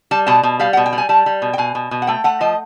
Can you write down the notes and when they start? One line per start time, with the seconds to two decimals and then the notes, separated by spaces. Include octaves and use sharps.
0.11 G3 A5
0.27 B2 A5
0.43 B2
0.60 G3 F5
0.73 B2 F#5
0.86 G5
0.93 G3
0.98 G#5
1.09 G3 A5
1.26 G3
1.42 B2
1.53 G5
1.58 B2 G#5
1.75 B2
1.91 B2
2.02 F#5
2.07 A3 G5
2.24 A3 F#5
2.41 F3 D#5